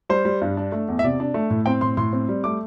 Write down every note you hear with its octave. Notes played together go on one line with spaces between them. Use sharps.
G3 C5
G3
G2
D4
A3
E2
E5
C3 D5
D4
A3
A2
C4 G5
A2 C6
A2 C6
C4
G3
A3 D6